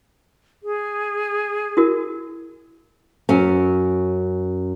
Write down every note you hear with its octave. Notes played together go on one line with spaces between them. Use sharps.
G#4
E4 F#4 A#4
F#2 C#4